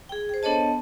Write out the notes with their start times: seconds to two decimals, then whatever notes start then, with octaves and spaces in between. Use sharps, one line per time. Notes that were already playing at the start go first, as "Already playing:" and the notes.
0.09 G#4 G5
0.29 G#4 C5
0.43 B3 D4 A4 C#5 D#5 A5